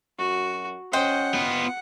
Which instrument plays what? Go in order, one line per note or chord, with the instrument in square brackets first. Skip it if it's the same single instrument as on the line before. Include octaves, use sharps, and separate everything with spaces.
[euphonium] F#2 [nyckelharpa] F#4
[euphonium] C#4 [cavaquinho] C5 D#5 G5 [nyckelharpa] F#5
[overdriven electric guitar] B3 F4